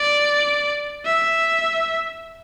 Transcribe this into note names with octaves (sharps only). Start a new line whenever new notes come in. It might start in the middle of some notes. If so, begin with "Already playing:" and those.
Already playing: D5
E5